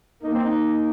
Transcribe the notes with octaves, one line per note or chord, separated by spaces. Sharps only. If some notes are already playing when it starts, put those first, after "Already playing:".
A#3 D#4
C4
D#4